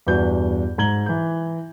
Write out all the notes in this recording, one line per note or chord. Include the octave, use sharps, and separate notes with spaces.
E2 G2 F#4 B4 G6
G#2 A#5 G#6 F#7 G7
E3 G6